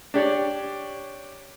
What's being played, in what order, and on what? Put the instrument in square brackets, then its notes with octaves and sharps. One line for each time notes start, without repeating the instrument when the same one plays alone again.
[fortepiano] D4 G4 C#5 D5